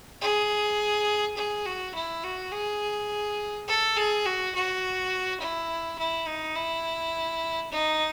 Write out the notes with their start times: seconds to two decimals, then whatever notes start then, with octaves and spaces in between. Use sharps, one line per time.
0.21 G#4
1.36 G#4
1.65 F#4
1.94 E4
2.23 F#4
2.52 G#4
3.68 A4
3.97 G#4
4.26 F#4
4.55 F#4
5.40 E4
5.98 E4
6.27 D#4
6.56 E4
7.71 D#4